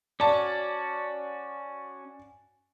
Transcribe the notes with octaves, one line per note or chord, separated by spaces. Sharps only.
C#4 F#4 D5 A5